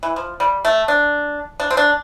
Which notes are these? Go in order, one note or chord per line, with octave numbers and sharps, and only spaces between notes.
E3
F3
G3
A3
D4
D4
C4
D4